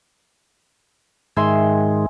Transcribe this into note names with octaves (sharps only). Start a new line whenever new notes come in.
G#2 D#3 G#3 E5 G#5 C6